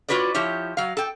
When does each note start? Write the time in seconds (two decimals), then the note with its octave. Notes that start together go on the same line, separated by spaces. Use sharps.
0.08 F4 F#4 B4 C#5 D5
0.35 F3 E4 G4 C#5
0.77 F#3 F5
0.97 A4 G5